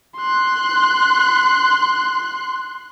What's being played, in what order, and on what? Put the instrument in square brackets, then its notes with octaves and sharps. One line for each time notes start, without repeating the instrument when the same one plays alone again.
[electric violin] C6 F#6